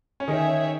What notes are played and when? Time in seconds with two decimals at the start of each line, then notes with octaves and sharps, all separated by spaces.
0.20 C#4
0.28 D#3 D#4 G#4 C#5 E5